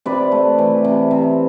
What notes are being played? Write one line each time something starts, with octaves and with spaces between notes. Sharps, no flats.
C3 B4 D5
A3
E3
C3
C3